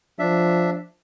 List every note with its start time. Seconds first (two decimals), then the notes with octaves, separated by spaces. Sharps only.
0.19 F3 D4 E5